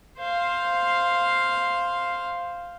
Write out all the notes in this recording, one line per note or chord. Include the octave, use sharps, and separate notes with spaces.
C5 F5